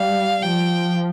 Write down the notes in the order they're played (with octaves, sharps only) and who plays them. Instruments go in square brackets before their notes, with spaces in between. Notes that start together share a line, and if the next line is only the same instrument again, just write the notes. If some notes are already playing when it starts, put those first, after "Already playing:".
Already playing: [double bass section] G3 [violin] F5
[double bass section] F3 [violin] G5